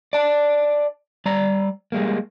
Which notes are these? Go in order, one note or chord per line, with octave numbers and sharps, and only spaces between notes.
D5 A5
G3 D5 A#5
G3 G#3 A#3